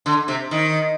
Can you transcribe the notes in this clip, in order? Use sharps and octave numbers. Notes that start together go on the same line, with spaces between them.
D3
C3
D#3